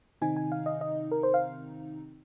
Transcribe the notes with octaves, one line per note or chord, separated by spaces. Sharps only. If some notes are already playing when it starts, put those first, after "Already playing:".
C3 D#3 C4 D#4 G#5
G#5
F5
D#5
D#5
A#4
C5
F5